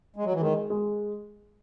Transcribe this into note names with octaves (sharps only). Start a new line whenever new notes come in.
G#3
F#3
E3
D#3 G#3
G#3